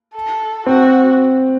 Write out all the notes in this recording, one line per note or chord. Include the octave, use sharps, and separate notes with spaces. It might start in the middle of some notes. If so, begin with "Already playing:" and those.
A4
C4 F#4